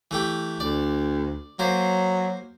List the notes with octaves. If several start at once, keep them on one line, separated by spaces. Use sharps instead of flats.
E3 A3 G4
D2 D5
F#3 A#3 C5